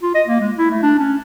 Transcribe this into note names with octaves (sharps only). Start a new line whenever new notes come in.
F4
D#5
A#3
G#3
E4
A3
D4
C#4